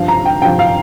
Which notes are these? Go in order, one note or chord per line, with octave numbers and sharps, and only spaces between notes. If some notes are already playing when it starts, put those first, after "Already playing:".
Already playing: G2 F3 F5
A#5
G5
G2 F3 G5
F5